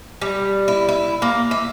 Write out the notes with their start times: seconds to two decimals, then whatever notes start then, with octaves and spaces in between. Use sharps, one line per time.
0.21 G3
0.68 E4
0.89 E4
1.22 A#3
1.51 E5